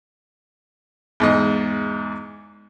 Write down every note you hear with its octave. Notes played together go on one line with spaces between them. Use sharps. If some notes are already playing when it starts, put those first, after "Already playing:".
E2 G#2 D#5